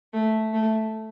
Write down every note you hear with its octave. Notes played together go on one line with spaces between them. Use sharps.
A3
A3